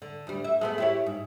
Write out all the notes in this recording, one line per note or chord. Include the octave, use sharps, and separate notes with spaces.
D3
D2 G3
E5
G#3 A3 B3
E4 G4 C#5
G#2